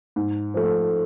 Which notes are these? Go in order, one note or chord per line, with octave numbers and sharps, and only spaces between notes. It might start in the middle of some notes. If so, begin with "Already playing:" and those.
G#2
F3 A3